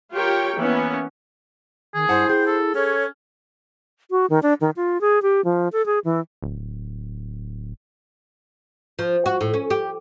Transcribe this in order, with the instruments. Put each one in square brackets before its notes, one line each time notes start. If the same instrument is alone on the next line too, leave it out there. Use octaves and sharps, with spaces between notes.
[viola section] F4 G4 A#4 C#5 G5
E3 A#3 B3 C#4
[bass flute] D#3 [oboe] G#4
[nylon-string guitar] G2 F#5 A5 [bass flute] E4 [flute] C5
[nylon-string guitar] G#4 [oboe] G5
[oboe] A4
[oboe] C#4 [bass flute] A4 [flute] C#5
[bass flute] F#4
D#3
D4
D#3
F4
G#4
G4
F3
A4
G#4
E3
[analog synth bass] D1
[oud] F3
F#4
A2
C#4
G4